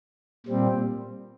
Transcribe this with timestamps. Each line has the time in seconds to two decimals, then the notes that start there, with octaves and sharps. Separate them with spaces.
0.46 A#2 G3 C4